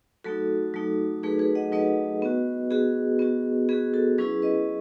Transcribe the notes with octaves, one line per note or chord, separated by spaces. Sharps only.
F#3 A3 D#4 F#4 A4
F#3 A3 D#4
F#3 A3 D#4 G#4 B4
G#4 B4
D#5 F#5
F#3 A3 D#4 B4 D#5
B3 F#4
B3 F#4 G#4
B3 F#4
B3 F#4 G#4
F#4 A4
F#3 C#4 E4 G#4 B4
B4 D#5